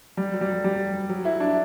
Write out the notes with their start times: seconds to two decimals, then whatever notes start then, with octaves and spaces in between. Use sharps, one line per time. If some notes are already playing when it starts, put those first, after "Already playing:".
0.17 G3
0.34 F#3
0.41 G3
0.64 G3
1.09 F#3
1.25 E4
1.40 D4